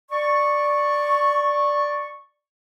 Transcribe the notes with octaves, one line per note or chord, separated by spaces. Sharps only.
D5 C#6